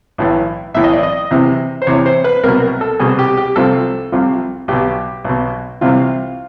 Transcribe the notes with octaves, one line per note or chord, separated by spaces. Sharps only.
B1 A2 E3
B1 A2 E3 E5
D#5
D5
D#5
E2 C3 E3
C5
E2 C3 E3 C#5
C5
B4
C2 B2 A#4
A#4
A4
C2 B2 G#4
G4
G4
C2 C3 F3 A4
C2 C3 F3
B1 B2 G4
B1 B2
C2 C3 E3 F4